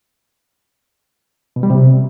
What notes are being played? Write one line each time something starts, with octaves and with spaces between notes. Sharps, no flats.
B2
G3
C3